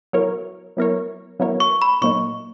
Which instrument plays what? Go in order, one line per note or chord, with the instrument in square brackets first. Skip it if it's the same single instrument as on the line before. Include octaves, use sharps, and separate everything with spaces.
[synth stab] F#3 B3 E4 A#4 C#5
F#3 B3 E4 A#4 C#5
F#3 B3 E4 A#4 C#5
[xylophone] C#6
B5
[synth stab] A#2 F#3 A#3 D#4 [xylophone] C#6